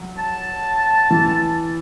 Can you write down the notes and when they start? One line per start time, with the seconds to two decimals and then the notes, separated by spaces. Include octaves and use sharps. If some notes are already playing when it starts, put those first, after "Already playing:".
Already playing: F#3
0.18 A5
1.11 E3